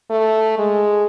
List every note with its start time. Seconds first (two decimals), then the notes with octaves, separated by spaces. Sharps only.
0.10 A3
0.58 G#3